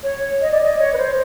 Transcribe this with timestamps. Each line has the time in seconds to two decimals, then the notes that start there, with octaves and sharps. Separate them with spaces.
0.03 C#5
0.41 D#5
0.51 D5
0.62 D#5
0.79 C#5
0.93 B4
0.98 C5